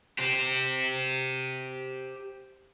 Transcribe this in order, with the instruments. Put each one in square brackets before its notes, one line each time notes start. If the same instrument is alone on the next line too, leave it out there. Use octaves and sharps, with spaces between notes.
[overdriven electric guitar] G4 C5